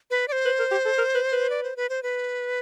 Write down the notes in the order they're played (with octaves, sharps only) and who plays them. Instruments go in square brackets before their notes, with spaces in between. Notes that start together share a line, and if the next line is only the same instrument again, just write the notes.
[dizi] B4
D5
C5
[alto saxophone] B4
A#4
G4
A4
A#4
B4
B4
[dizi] D5
C5
B4
C5
B4